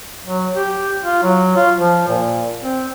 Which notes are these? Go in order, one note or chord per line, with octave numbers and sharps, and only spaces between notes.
F#3
G4
F4
F#3
F4
F3
A#2
C4